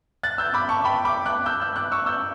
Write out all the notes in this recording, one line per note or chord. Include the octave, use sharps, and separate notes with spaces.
F#6 A6
E6 G6
B5 D6
A5 C#6
G5 B5
B5 D6
D6 F#6
E6 G6
E6 G6
D6 F#6
C#6 E6
E6 G6